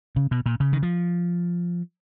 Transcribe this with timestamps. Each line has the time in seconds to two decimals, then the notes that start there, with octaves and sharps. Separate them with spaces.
0.16 C#3
0.31 B2
0.46 A#2
0.60 C#3
0.73 D#3
0.83 F3